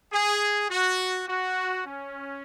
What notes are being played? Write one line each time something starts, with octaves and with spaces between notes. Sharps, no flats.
G#4
F#4
F#4
C#4